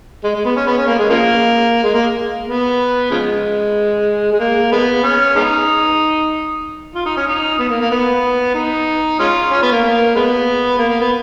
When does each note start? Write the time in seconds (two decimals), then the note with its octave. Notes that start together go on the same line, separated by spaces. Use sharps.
0.24 G#3
0.35 G#3
0.45 B3
0.56 C#4
0.67 B3
0.78 C#4
0.87 A#3
0.99 G#3
1.10 C#3 F3 A#3
1.84 G#3
1.94 A#3
2.48 B3
3.11 C#3 F3 G#3
4.32 G#3
4.40 A#3
4.71 G#3 B3
5.03 C#4
5.36 G#3 B3 D#4
6.95 F4
7.06 D#4
7.17 C#4
7.27 D#4
7.59 B3
7.70 A#3
7.81 A#3
7.91 B3
8.55 D#4
9.19 G#3 C#4 F4
9.51 C#4
9.62 B3
9.72 A#3
9.83 A#3
10.15 G#3 B3
10.78 A#3
10.89 A#3
11.00 B3